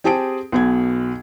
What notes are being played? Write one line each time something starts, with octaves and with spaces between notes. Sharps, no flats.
C4 G4 G#4 A5 D#6 D7
B1 B2 G#6